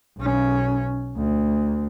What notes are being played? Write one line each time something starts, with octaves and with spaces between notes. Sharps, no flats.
B1 C#4
D2